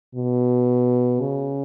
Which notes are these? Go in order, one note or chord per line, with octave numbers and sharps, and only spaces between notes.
B2
C#3